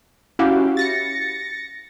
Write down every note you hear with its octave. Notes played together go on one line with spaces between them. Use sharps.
C#4 E4 F#4 G4 F5
A6 A#6 C#7